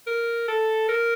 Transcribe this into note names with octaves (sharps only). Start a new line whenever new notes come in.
A#4
A4
A#4